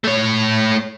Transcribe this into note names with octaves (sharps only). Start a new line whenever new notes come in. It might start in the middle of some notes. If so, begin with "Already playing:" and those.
A3 C#5